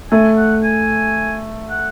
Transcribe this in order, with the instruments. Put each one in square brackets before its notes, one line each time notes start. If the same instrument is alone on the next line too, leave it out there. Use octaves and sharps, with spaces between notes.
[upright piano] A3 [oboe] G#5
[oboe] F#5
G#5
F#5